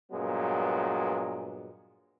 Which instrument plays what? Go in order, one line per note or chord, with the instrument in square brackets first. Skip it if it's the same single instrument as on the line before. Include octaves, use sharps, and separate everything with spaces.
[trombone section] G2 A#2 F#3 G#3 B3